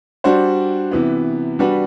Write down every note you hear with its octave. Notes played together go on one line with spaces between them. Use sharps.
G3 D4 F#4 C5
C3 E3 B3
G3 D4 F#4 B4